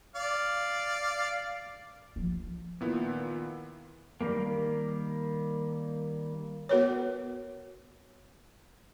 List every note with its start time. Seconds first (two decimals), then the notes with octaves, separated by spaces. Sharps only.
0.15 D5 F5
2.16 F3
2.81 A#2 D#3 B3 E4
4.21 D#3 G3 A#3
6.69 B3 F#4 A#4 B4 C#5